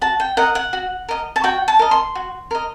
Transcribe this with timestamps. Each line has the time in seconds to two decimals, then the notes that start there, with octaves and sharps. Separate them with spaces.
0.01 F#4 A5
0.20 G5
0.37 A#4 D#5 F#5
0.55 F#5
0.73 F#4
1.08 A#4 D#5
1.36 A5
1.44 F#4 G5
1.68 A5
1.79 A#4 D#5
1.91 C6
2.15 F#4
2.51 A#4 D#5